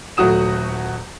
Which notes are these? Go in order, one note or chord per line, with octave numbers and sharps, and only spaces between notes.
D#1 F#3 A3 F#4 D#6 E7